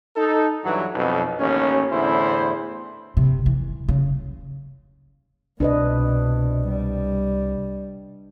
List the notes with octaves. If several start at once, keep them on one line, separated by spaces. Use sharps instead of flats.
D#4 A4
G2 E3 F#3
B1 F2 B2
A1 D#2 C#4
E2 A2 D3 E4 C5
C3
E3
C#3
C2 B2 D4 B4 D#5
G3